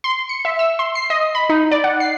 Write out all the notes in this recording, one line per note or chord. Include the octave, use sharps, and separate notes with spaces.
C6
C#7
E5
E6
C6
C7
D#5
B5
D#4
D5
F#5
C7